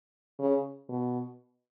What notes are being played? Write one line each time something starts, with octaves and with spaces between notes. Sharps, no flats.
C#3
B2